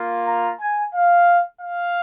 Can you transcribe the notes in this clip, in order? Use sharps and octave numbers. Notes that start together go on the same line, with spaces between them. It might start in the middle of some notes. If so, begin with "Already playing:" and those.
Already playing: A#3 F4
A#5
G#5
F5
F5